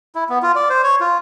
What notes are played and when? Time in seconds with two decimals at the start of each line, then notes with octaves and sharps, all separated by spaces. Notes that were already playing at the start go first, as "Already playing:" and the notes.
0.15 E4
0.29 B3
0.43 F4
0.56 D5
0.70 C5
0.84 C#5
1.01 F4